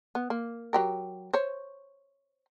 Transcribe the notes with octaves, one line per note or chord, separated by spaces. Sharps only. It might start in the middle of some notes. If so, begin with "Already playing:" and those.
B3
A#3
F#3 G4 A#4
C5 C#5